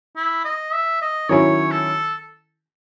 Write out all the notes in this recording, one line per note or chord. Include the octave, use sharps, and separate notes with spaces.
E4
D#5
E5
D#5
D#3 F#3 C#4 E4 C#5
A4